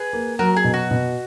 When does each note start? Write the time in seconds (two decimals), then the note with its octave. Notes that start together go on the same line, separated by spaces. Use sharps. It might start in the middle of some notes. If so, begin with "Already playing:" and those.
Already playing: G#4 B4
0.13 A#3
0.39 F#3 F#4 A#4
0.56 G#4
0.64 B2
0.74 F#4
0.91 B2